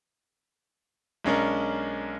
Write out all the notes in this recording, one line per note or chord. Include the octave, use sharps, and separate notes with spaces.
B1 G#3 C#4 D4 A#4